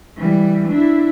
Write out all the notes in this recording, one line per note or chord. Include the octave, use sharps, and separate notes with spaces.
E3 G3
D4 E4